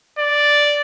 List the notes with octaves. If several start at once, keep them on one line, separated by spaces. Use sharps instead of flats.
D5